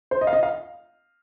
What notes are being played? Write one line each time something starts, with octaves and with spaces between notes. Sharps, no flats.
C5
D#5
F5
D#5
F5